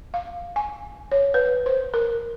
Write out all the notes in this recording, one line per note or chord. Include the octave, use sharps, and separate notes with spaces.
F5
G#5
C#5
B4
C5
A#4